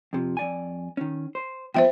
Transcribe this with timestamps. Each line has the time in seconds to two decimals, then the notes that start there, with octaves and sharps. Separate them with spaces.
0.13 F2 C3 F3
0.37 F2 D5 G#5
0.97 D#3 C#4
1.35 C5
1.74 E2 F3 B3 C5 E5 G5